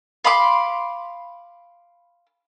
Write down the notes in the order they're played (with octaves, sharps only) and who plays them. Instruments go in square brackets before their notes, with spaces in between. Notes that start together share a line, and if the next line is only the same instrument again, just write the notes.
[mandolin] F5 B5 C6 D6